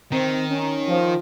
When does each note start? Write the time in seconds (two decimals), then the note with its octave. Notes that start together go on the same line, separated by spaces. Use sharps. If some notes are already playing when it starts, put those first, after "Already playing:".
0.12 D#3 C4
0.50 C#4
0.88 F3